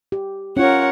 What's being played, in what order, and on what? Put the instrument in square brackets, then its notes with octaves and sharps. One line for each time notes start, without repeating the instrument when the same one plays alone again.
[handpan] G4
[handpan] C#4 F4 [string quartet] A#4 C#5 F#5